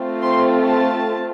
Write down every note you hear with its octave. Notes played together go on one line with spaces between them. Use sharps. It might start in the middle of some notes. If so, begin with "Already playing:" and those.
Already playing: A3 C4 F4
C6
A5